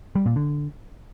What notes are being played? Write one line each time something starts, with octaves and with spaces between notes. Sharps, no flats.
G3
A#2
D3